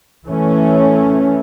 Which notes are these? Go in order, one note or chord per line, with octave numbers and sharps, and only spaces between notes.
E3 A3 C#4